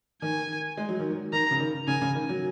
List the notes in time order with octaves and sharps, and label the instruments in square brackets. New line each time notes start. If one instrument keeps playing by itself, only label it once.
[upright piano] D#3 [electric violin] G#5
[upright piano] G#3
F#3
D#3
F#3
[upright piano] D#3 [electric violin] A#5
[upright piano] C#3
D#3
[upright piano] C#3 [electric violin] G#5
[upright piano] C#3
D#3
F#3